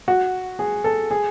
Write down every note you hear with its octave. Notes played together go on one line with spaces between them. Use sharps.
F#4
G#4
A4
G#4